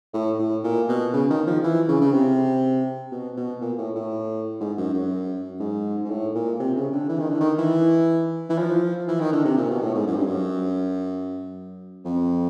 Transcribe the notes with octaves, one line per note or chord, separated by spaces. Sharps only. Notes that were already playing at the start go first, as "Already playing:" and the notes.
A2
A2
A#2
B2
C#3
D#3
F3
E3
C#3
C#3
C3
B2
B2
A#2
A2
A2
G#2
F#2
F#2
G#2
G#2
A2
A#2
C3
C#3
D3
E3
D#3
D3
D#3
E3
E3
F3
E3
D#3
D3
C3
A#2
B2
A2
G#2
F#2
G2
F#2
F2